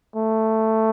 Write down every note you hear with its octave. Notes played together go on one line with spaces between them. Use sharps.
A3